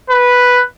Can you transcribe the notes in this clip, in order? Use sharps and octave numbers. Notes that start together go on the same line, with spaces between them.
B4